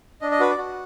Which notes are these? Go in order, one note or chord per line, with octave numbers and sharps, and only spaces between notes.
D4 D#5
D#5
F#4 B4
D5
F#4